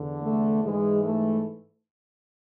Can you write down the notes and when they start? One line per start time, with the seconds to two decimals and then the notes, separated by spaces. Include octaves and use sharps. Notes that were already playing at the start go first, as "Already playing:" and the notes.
Already playing: E2 D3
0.23 A3
0.64 G#2 E3 G#3
1.05 A3